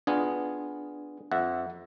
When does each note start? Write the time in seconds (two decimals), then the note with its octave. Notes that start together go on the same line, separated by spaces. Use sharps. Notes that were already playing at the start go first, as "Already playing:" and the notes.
0.07 B3 D4 F4 G#4
1.32 F2 E5 F#5